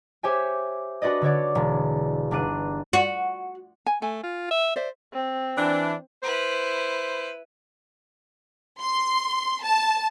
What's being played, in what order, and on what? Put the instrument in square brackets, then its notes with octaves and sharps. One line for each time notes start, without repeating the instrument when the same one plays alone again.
[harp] G4 C5 C#5 E5 G#5
D4 F#4 B4 D5 D#5
D3 A4 C#5 D5
E1
G1 D4 F#6 D#7
[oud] F#4
[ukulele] G#5
[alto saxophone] A3 [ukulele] G#5
[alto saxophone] F4
E5
[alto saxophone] C5 [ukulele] D5 E5
[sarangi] C4
[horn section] E3 D4
[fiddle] E4 B4 [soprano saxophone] C5
[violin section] C6
A5